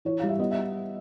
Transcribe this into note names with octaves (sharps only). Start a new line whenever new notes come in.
E3 C#5
G3 F5
E5
B3 D#5
E5